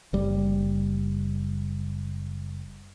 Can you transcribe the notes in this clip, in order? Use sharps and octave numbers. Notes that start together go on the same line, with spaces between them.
F#1 G3